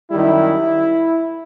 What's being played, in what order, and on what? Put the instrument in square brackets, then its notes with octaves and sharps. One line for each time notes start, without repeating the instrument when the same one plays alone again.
[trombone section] F#2 D#3 G3 E4